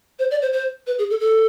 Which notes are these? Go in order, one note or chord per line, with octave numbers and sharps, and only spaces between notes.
C5
D5
C5
C5
B4
G#4
A4
A4